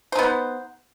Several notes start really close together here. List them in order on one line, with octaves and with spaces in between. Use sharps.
C5 D#4 B3